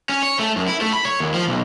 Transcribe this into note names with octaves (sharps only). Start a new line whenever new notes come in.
C#4
C#5
A3
F#2
E4
A3
B5
C#5
D#2
F3
B1